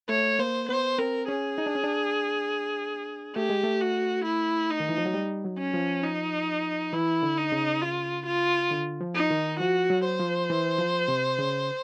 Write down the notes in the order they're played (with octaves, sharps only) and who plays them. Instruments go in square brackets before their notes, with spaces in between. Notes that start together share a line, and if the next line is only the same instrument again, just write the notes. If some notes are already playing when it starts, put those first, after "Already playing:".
[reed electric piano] A3 [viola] C#5
[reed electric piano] A#3 [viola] C5
[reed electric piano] B3 [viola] C5
[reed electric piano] C4 [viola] A#4
[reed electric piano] C#4 [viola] G#4
[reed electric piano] D#4
D4
C#4
D4
[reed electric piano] A3 [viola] G4
[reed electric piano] G#3
A3
[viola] F#4
E4
D#4
[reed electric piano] D#3
E3
F3
F#3
G3
F#3
[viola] C#4
[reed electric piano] F3
[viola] D#4
[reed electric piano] E3 [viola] E4
[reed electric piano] D3
[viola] D#4
[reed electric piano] C#3
[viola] F4
F4
[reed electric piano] D3
F3
[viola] D#4
[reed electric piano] D#3
[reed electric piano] F3 [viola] F#4
[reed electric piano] F#3
[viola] C5
[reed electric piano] F3
E3
F3
C3
C#3